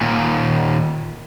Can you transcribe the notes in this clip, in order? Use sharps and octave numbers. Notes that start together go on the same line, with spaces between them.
D#2 A#2